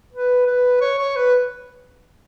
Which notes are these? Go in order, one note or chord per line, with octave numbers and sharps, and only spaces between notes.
B4
B4
C#5
C#5
B4